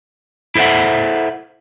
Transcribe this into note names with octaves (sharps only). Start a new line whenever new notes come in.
E4 A4 C5 E5 F#5